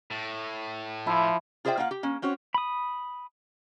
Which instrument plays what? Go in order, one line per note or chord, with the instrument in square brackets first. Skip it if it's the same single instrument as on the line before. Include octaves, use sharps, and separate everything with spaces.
[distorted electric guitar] A2
[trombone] F3 [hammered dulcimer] E4
[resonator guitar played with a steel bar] F4 G#4 C5 D5 E5 G5
A#3 F4 F5 F#5
G4
A#3 C#4
C4 C#4 F#4 C5 C#5
[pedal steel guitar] B5 D#6